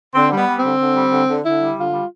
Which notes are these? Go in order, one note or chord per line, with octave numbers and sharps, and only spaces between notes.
D3 C4
G3
B3
G3
C4
D3
D3
G3
D3
D3
D3 E4
G3
D3 F4
G3